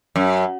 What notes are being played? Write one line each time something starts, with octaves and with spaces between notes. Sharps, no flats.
F#2